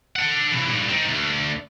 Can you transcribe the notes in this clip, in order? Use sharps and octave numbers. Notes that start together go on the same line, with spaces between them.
A4 F#5
C3 E3
G#2 G3
C4 D#4
D2